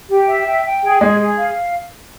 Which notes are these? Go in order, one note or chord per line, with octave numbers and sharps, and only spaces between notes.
G4
E5
G5
G5
G#4
G#3 G#4
G#4
F5